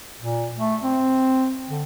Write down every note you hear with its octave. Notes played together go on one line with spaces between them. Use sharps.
A#2
A3
C4
D3